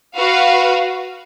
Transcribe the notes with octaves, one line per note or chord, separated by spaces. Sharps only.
F#4 B4 F5